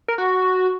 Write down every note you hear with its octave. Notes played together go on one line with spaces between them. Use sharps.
A#4
F#4